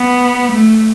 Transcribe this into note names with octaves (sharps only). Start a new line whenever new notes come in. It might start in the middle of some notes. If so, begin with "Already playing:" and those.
Already playing: B3
A3